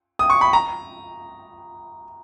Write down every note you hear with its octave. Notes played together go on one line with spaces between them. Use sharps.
D#6
C#6
B5
A#5